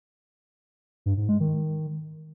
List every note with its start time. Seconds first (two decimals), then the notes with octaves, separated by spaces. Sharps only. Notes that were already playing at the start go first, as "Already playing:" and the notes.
1.06 G2
1.17 G#2
1.29 G#3
1.40 D#3